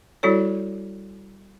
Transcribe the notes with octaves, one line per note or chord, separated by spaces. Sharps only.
G3 E4 F#4 A4 C#5